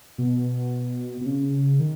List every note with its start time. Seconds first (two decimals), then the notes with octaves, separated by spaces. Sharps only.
0.18 B2
1.21 B2
1.26 C#3
1.80 D#3